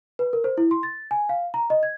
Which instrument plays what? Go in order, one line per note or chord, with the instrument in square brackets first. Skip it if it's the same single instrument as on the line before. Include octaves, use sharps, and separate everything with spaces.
[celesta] B4
A#4
C5
E4
C6
A6
G#5
F5
A#5
D#5
G#6